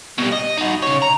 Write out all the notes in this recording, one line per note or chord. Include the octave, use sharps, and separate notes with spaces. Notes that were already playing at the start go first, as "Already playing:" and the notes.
B2 G3
D#5
D#4 F#4
C#3 C#5
A#5